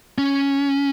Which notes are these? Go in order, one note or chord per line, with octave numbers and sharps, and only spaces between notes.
C#4